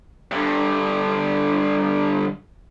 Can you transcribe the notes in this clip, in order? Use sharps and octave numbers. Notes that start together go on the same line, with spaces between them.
G2 D3